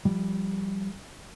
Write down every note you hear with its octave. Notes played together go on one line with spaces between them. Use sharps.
F3 G3